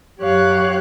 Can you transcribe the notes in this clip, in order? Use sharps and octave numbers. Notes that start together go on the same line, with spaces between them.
F#2 G4 C#5 F5 F#6